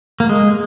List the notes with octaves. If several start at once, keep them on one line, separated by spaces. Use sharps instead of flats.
A#3
G#3